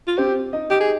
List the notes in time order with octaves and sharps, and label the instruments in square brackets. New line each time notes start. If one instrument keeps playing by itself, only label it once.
[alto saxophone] F4
[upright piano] C4 C5 [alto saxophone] G4
[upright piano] D#4 D#5
[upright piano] D#4 D#5 [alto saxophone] G4
[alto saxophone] G#4